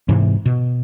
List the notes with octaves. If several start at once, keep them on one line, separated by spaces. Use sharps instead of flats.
G#2 C3 E3
B2